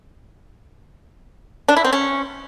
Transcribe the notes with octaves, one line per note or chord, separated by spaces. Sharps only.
D4
E4
C4
C#4